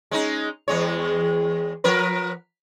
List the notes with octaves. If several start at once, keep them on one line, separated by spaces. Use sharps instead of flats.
G#3 C#4 D#4
E2 G#3 C#5
F3 A#4 B4